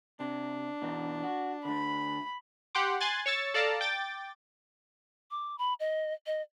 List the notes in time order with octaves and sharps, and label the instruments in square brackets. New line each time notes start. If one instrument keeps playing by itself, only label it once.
[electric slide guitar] C3 [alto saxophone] D4
[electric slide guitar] B2 E3 D#4
F#4
[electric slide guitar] D3 A3 [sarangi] B5
[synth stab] G4 F#5 G5 C6 D6
G#5 C6 F#6 G#6 A6
C#5 C#6 E6 A6
A4 D5 F5 A5 A#5
G5 D6 A6
[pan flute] D6
B5
D#5
D#5